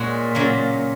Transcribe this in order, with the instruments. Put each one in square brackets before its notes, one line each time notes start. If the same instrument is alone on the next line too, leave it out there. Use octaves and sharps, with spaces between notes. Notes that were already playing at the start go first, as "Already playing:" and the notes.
Already playing: [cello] A#2 [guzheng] G#3 A#3 F#4 C#5
[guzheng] C#3 F#3 A#3